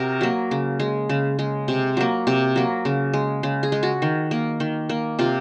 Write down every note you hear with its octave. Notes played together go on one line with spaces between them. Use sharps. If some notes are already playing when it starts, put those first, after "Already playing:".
Already playing: C3 F#4 A#4
F#3 A#3
C#3
G#3
C#3
G#3
C3
F#3 A#3
C3
F#3 A#3
C#3
G#3
C#3
G#4
G#3
F#4
D#3
A#3
D#3
A#3
C3 F4